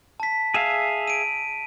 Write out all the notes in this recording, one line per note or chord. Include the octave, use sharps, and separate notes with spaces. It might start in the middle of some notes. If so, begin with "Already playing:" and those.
A5 B6
G#4 E5 F5
D7 D#7